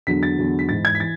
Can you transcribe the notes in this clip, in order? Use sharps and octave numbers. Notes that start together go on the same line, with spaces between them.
E2 D3 F#3 B6
A6
E2 D3 F#3
B6
G#2 E3 A6
G#6
B6
E3 A6